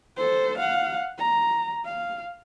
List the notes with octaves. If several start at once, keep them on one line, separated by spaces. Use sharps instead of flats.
A4 C5
F5 F#5
A#5
F5